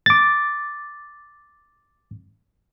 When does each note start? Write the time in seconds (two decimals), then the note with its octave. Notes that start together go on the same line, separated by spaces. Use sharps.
0.06 D6 A6